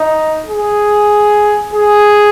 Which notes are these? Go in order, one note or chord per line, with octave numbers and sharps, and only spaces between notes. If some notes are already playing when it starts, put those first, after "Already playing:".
Already playing: D#4
G#4
G#4